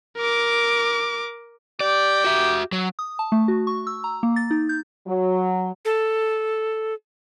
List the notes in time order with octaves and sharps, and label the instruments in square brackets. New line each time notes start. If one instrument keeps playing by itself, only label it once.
[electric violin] A#4 D6
[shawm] G4 [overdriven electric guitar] D5
[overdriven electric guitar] F#4 E5
F#3
[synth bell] D#6
A5
A3
F#4
C#6
E6
A#5
A#3
A6
D#4
G6
[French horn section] F#3
[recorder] A4